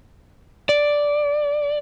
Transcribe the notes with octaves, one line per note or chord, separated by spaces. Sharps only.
D5